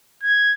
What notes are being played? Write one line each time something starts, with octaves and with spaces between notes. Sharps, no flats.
G#6